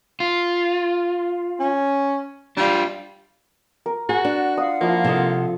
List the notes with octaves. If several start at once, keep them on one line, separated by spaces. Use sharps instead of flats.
F4
C#4
G3 D4 F4
A#4
F#4 G#4 F#5
D4
F4 F5 F#5 D#6
F3 A#3 E4
C3 A4 D#6